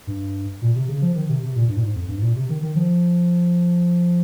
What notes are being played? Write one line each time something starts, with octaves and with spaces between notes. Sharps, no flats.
G2
A#2
C3
C#3
F3
D#3
C3
C3
A#2
G2
A#2
G#2
F2
G2
G#2
A#2
C3
D#3
D#3
F3